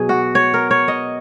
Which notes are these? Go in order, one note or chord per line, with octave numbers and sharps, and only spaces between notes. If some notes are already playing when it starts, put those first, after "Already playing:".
Already playing: B2 F#3 G#4
F#4
C#5
A#4
C#5
D#5